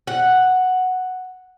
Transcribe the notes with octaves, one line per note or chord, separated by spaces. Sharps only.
F#5